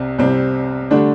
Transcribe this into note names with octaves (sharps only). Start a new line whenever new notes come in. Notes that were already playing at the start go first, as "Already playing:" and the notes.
Already playing: C2 C3 C4
C2 C3 G3 C4
D3 G3 A3 D4